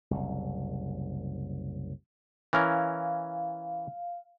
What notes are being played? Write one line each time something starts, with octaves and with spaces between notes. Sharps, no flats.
F#1 C2
E3 C#4 A#4 F5